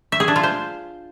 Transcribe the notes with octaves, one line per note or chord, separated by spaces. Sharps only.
E5
G#4
D4
F4
C5